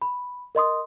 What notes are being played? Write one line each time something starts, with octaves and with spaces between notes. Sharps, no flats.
B5
A#4 D#5 C6 D#6